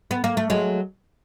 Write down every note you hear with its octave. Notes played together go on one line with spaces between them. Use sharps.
B3
A#3
A3
F#3 G#3